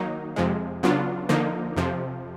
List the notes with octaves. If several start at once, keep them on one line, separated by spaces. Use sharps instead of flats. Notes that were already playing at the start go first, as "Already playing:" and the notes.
Already playing: D#3 F#3 A#3 D#4
F2 C3 F3 G#3
C#3 F#3 B3 D4 F4
D3 F3 A#3 D#4
F2 C3 F3